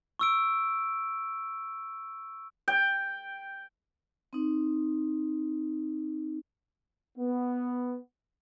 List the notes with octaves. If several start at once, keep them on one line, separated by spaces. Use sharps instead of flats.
C#6 E6 D7
G5
C4 D#4
B3